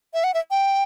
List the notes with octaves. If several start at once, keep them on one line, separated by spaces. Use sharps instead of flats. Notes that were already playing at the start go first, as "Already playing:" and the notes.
E5
F#5
E5
G5